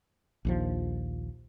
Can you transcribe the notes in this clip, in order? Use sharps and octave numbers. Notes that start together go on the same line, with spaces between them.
A#1 D#2 F3